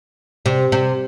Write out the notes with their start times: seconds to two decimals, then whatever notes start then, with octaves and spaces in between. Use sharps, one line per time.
0.46 C3
0.72 C3